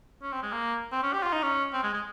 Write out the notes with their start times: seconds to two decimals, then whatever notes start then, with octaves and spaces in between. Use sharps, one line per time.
0.22 C#4
0.32 C4
0.43 G#3
0.53 A#3
0.92 C4
1.03 C#4
1.13 G4
1.23 F4
1.33 D#4
1.43 C#4
1.73 C4
1.83 G#3
1.93 G#3